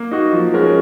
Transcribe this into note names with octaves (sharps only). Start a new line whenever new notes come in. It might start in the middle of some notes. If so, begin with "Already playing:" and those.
Already playing: A#3
D#4 F#4
F3
G#3 C#4 F#4 A#4